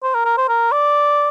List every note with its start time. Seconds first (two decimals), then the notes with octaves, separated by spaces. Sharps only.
0.03 C5
0.14 A#4
0.25 A#4
0.37 C5
0.49 A#4
0.71 D5